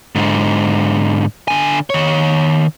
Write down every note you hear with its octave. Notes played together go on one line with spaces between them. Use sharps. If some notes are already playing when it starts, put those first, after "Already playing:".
G#2 D3
D3 G#5
D#3 C#5